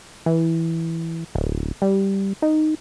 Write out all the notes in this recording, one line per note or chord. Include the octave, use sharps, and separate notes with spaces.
E3
D1
G3
D#4